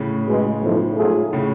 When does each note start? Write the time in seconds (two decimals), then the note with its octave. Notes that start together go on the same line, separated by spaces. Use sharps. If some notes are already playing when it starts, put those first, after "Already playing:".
Already playing: A2 C#3
0.27 C#2 B2 G#3
0.62 B1 A2 F3
0.97 G#2 F#3 A3 F4 G#4
1.33 A2 C#3